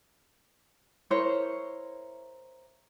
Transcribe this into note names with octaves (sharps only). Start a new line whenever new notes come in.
E4 A#4 C5 C#5